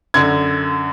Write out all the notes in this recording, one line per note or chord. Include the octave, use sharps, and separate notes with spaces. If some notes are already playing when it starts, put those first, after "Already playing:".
F#2 D3 G#6